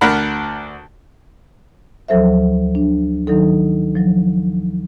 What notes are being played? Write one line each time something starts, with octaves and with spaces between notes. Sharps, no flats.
D2 D4 A#4 F#5 B5
D2 F3 F#3 A4 C5 E5
D4
D#3 F#3 D#4 A4
F3 F#3